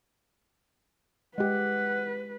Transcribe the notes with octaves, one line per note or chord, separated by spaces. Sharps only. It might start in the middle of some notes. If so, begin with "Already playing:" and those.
G#3 G4 B4 F#5